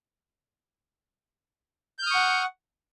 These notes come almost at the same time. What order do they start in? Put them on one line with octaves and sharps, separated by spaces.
G6 F6 D#6 C#6 F#5